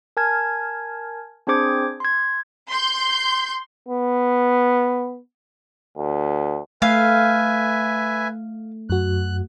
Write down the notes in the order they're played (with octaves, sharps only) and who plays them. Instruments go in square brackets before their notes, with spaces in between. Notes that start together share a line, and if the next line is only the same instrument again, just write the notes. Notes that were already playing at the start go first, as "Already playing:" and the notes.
[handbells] A#4 G#5 A5 F6 G#6
C4 D4 G#4 C5 D6 G#6
C6 G#6
[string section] C6 G6
[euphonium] B3
D2
[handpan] A3 [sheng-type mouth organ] B4 E5 G#5 [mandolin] F5
[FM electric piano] F#2 F#4 [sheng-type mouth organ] F#6